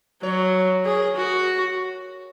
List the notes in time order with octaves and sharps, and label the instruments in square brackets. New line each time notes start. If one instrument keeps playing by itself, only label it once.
[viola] F#3 [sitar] C#5
[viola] G#4 [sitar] C#5
[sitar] A#4
G#4
[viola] F#4 [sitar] A#4